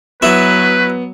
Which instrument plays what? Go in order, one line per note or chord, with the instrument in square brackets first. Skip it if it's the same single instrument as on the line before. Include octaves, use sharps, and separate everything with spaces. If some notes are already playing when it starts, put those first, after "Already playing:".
[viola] F#3 [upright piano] B3 [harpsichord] E4 [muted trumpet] B4